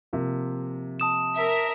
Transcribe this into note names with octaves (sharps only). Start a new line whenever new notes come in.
C3 F3 A#3
A5 D#6 E7
A#4 E5